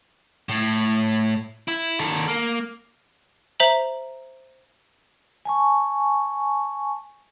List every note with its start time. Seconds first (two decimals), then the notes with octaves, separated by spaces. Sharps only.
0.49 A2
1.68 E4
2.00 D#3 A4
2.28 A#3
3.60 C5 E5 A#5 F#7
5.45 G#5 A5 C#6